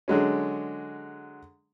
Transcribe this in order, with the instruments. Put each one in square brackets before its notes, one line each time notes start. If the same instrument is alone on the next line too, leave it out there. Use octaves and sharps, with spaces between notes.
[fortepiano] D3 F#3 G#3 C#4